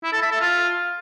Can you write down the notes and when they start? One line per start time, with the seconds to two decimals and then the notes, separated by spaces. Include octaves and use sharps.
0.04 E4
0.13 A4
0.22 E5
0.32 A4
0.41 F4